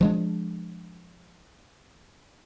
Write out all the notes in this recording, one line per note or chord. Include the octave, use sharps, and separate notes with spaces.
F3 G#3 D4